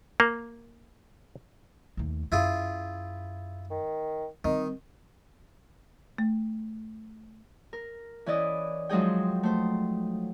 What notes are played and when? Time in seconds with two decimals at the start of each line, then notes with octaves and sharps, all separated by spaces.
0.20 A#3
1.97 D#2 A3
2.32 F#2 E4 F4 G#4
3.70 D#3
4.45 D#3 G3 C4 D#4
6.18 A3
7.73 A#4
8.26 E3 C#4 E4 D5 D#5
8.89 F3 F#3 G#3 D#4 G#4 G5
9.43 A3 C5